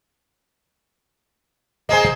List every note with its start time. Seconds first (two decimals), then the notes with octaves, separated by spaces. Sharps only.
1.89 A#3 G#4 C5 D#5 G#5